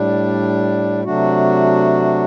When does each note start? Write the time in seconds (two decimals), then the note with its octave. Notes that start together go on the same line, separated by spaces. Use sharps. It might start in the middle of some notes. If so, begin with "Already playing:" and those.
Already playing: A2 G3 D4
1.05 C3 F#3 A3 D4 F#4